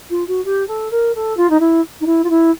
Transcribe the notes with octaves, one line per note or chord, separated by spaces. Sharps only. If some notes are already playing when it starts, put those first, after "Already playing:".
F4
F#4
G4
A4
A#4
A4
F4
D#4
E4
D#4
E4
F4
E4